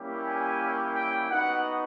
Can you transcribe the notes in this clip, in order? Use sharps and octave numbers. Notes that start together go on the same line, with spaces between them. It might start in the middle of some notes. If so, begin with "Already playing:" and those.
Already playing: G3 A#3 C#4 E4 G4
G#5
G5
B3 D#4 F#4 F#5